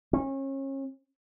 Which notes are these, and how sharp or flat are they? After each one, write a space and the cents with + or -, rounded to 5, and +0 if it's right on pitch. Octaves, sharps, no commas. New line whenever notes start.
C#4 -35